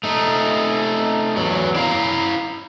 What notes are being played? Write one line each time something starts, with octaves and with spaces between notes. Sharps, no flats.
A3 D#4
E2 F#3
D4 E4 F5 A#5